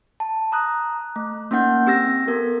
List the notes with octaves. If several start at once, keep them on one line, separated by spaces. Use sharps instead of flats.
A5
A#5 D#6 F#6
A3
A#3 C#4 D#4 F#5 G6
C4 G4 E6 A6 A#6
B3 A4 A#4